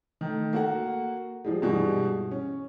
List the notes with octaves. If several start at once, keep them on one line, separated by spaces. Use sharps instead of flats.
D#3 A3
A#3 F#4 A4 F#5
F3 G3 G#3
G2 B2 E3 G3 G#3
C#4